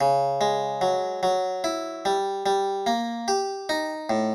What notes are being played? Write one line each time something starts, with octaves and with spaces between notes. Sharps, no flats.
C#3
G#3
F#3
F#3
E4
G3
G3
A#3
G4
D#4
A2